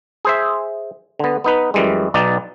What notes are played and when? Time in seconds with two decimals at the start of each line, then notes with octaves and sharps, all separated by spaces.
0.25 G#4 C5 E5
1.19 D3 B3
1.44 B3 D#4 B4
1.74 F#2 E3 G3 G#3
2.14 B1 B2 D#4 D5